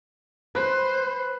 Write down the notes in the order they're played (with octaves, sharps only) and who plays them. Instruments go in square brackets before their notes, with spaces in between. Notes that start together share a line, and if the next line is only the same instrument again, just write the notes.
[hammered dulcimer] B4 [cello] C5